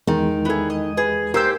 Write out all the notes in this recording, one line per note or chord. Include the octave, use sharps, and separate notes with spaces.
E2 D#3 G#3
B3 E4 G#4 A4
D#5
G#4 B4
G4 A#4 C5 E6 G6